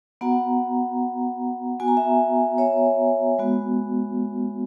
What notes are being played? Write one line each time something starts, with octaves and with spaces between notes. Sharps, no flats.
B3 F#4 F#5 A#5
B3 F#4 G#5
A#5
E5 G#5
C#5 E5
G#3 B3 F#4